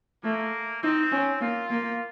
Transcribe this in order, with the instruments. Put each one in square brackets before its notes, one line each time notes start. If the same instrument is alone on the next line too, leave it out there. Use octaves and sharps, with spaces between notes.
[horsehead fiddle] A3 [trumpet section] A#3
[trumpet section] C4 [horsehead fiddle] D#4
[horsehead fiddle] C#4
[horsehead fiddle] A#3 [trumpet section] F4
[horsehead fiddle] A#3